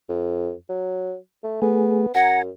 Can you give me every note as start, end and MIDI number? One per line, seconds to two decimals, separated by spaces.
0.09 0.52 41
0.69 1.15 54
1.43 1.58 57
1.62 2.06 57
1.62 2.13 59
1.62 2.06 68
2.15 2.50 42
2.15 2.40 78
2.15 2.42 80
2.15 2.42 82